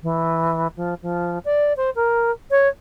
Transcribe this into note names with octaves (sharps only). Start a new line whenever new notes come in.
E3
F3
F3
D5
C5
A#4
C#5